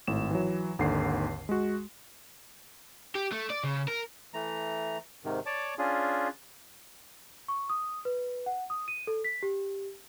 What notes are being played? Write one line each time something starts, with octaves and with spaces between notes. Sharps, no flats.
G#1 A2 E7
E3 F#3
G#1 D#2 D3 F#5 C7
G#3 F#4
G4
A3
D5
C#3
A#4
E3 A3 A#5
G#2 C3 D#3
C#5 D5 A5 D6
C#4 D4 F4 G#4
C#6
D#6
B4
F#5
D#6
D#7
A4
B6
G4